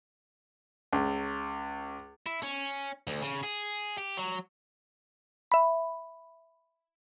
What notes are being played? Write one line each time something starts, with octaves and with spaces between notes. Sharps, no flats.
C#2
E4
C#4
D2
C#3
G#4
G4
F#3
E5 B5